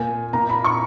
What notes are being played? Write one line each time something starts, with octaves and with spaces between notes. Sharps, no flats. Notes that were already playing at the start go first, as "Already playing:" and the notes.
Already playing: A#2 G#5
A#2 A#5
B5
C#6